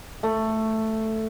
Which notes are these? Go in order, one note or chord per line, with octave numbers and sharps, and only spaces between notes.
A3